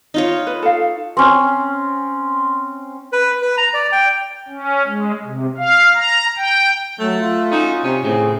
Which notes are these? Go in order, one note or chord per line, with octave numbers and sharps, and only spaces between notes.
D#4 F4 C#5
B4
A4 F5
C4 C#4
B4
B4
A#5
D5
G5
C#4
G#3
C3
F5
A#5
G5
F#3 A3
F4
C#4 D#4 F#4
C3 C#4
A2 C#3 C4 G#4